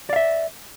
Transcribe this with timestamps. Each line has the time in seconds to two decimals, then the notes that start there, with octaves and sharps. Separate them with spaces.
0.09 D5
0.13 F5
0.16 E5